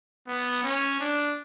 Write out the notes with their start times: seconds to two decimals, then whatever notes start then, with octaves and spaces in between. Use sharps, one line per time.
0.28 B3
0.63 C#4
1.00 D4